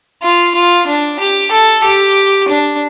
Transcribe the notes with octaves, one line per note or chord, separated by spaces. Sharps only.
F4
F4
D4
G4
A4
G4
D4